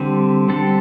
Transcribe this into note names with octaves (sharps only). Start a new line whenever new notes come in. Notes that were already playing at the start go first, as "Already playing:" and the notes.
Already playing: D3 G3 C4 G4
D3 G3 C4 A4